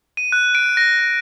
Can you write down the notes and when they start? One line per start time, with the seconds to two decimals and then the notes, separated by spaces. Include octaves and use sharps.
0.17 D#7
0.32 F#6
0.55 D7
0.77 A#6
0.99 A#6